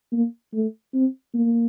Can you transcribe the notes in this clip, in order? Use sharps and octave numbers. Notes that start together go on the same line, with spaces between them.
A#3
A3
C4
A#3